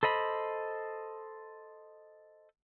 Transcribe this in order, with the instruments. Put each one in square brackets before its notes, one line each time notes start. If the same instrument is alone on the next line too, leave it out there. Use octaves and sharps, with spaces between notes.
[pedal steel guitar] A4 C5 D#5 B5